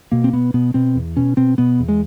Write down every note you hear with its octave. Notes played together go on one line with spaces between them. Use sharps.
B2 A#3
C4
B2 B3
B2 B3
B2 C4
E2
B2 C#4
B2 C4
B2 B3
E2
G#3